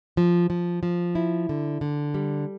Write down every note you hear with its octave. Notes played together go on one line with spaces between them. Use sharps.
F3
F3
F3
E4
D3
D3
G3